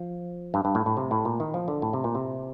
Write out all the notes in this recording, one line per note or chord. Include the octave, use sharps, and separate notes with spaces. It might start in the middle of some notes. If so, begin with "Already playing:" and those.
Already playing: F3
G2
G2
A2
A2
C3
A2
A#2
D#3
F3
D3
A2
C3
A#2
C3